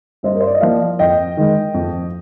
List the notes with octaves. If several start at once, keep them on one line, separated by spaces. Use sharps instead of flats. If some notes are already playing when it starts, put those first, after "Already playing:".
G2 C5 D#5
A#4
C5
D5
D#5
F3 A#3 D5 F5
F2 D#5 G5
D#3 G#3
F2